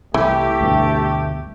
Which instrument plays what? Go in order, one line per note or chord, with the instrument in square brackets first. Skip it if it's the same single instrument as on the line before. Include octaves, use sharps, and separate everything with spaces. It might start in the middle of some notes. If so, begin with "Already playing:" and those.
[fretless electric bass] C2 [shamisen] E3 [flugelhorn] A3 [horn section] G4
[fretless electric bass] D2 G2 B2